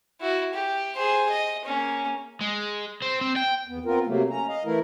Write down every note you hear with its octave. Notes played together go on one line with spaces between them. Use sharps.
E4 F#4
G4
G#4 C5
D#5
A#3 C#4
G#3
C4
C4
G5
E2 B3
B3 C4 F4 A#4
C3 F#3 A3 A#3
C#4 A#5
D#5 F5
E3 A3 E4 A#4